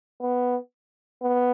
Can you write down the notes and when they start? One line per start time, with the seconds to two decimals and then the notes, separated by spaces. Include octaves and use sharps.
0.21 B3
1.22 B3